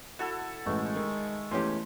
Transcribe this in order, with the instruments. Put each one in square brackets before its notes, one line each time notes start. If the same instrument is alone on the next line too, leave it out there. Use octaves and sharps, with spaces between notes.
[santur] E4 A4 F#5 [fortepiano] F#4
[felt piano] A1 [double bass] G#3 [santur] A3
[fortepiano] D#3 [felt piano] D#4
[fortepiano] E2 C#4 G4 [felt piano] E3 A3 [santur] C6